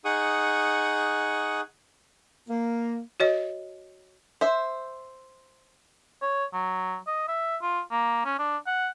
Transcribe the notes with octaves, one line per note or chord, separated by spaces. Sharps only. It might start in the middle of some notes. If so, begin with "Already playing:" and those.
D#4 G#4 F#5 C#6 D#6
A#3
F#4 C#5 D#5
C5 E5
C#5
F#3
D#5
E5
F4
A#3
C#4
D4
F#5